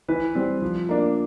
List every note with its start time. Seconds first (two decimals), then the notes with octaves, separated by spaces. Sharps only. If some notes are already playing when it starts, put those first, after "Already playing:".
0.08 E3 B4
0.35 G3 C4
0.62 F3
0.89 A#3 D4